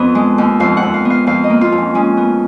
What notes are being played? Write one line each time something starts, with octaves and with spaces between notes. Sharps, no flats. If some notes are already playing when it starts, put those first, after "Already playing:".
Already playing: F2 B3
G#3
D#2
F2 F5
F#5
F2
F5
B3
F5
F2 F5
D#5
A#3
F4
F2
C#4
G#3 C#4
B3